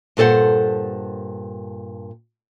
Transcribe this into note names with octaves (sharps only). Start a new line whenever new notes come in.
G2 A#2 A4 C5 F#5